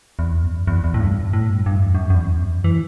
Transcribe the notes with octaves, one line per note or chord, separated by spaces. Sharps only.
E2
F#2
E2
E2
A2
G2
A2
G2
G2
F#2
E2
F#2
F#2
E2
F#2
E3